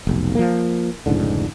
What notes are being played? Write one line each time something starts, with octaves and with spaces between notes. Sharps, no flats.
F1 B1
F3 A#3
F1 C#2 G#2 D3